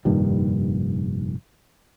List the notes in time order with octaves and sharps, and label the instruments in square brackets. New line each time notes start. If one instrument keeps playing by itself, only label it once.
[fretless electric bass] F1 G2 A#2 D#3